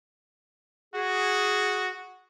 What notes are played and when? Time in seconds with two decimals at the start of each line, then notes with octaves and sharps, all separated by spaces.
0.94 F#4 G#4